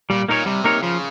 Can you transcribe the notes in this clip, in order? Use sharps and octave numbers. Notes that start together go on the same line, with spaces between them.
A#2 G3
A#2 A#3 D#4 A#4 C#5
C3 G3
A#3 D#4 A#4 C#5
C#3 F3